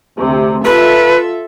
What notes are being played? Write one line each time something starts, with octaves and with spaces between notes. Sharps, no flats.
D2 C3
F4 A4 B4 E5